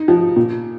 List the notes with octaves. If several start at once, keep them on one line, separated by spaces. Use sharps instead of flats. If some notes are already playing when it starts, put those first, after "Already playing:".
Already playing: D#4
F3
A#2